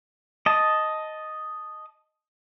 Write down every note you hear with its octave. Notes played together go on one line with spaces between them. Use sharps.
D#5 A5